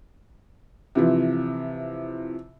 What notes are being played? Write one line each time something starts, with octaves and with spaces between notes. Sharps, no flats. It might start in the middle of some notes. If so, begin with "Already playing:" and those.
C3 E3 F3